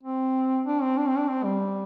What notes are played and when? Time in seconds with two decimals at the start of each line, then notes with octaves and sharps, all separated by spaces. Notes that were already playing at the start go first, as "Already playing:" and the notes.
0.03 C4
0.65 D4
0.82 C4
0.97 D4
1.08 C4
1.18 D4
1.28 C4
1.44 G3